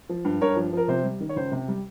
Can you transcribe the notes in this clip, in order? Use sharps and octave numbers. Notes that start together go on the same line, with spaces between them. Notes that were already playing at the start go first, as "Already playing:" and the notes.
F3
G2
G2 A#4 C#5
F3
F3 A#4
C3 C5
G3
D#3
C#5
C#2 C5
C3
G3